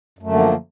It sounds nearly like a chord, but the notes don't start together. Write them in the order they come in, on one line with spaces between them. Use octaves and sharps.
F#2 A3 D3 A#3 F3